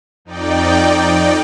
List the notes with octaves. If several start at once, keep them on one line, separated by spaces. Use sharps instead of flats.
F2 D#4 D5 G5